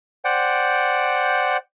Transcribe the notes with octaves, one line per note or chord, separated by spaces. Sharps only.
C5 D5 F#5 G5